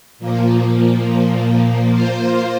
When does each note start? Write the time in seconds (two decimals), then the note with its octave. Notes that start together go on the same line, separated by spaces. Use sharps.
0.19 A#2 F3 A#3
1.06 A#2 F3 A#3
1.93 A#3 F4 C5